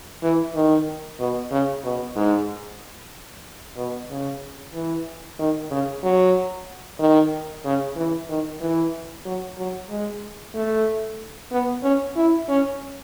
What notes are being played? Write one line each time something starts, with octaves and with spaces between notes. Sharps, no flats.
E3
D#3
B2
C#3
B2
G#2
B2
C#3
E3
D#3
C#3
F#3
D#3
C#3
E3
D#3
E3
F#3
F#3
G#3
A3
B3
C#4
E4
C#4